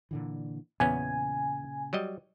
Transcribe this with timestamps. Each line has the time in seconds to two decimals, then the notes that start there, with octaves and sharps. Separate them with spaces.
0.11 A#2 D3 E3
0.80 E2 A#2 C#3 B3 C#4 G#5
1.93 F#3 G3 D#5